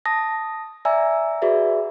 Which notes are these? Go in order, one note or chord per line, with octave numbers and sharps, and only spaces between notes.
A5 D#6 A#6
D5 E5 G#5 A#5 E6
F#4 G#4 B4 D5 E5